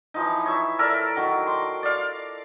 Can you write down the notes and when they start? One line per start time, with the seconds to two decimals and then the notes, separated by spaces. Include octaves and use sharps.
0.14 E3 F3 D#4
0.46 C#5 E5
0.79 A4 A#4 D5 E5
1.16 D#3 F#3
1.47 C6 D6
1.83 D5 F5